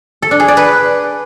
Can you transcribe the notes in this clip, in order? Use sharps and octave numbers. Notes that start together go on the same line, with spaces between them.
A4
D4
G#4
D5
B4